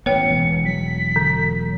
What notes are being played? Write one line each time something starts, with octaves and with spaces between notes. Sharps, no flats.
A1 B3 C#5 G5 C#7
E1 E3
F#3 B6
D3